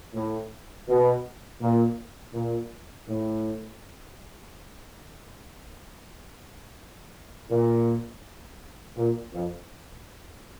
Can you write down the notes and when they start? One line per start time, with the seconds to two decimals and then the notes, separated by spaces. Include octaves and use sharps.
0.13 A2
0.87 B2
1.60 A#2
2.34 A#2
3.08 A2
7.49 A#2
8.96 A#2
9.33 F2